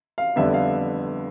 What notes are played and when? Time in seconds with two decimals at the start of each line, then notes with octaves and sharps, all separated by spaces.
0.18 F5
0.36 F2 D3 G3 B3 E5
0.54 F5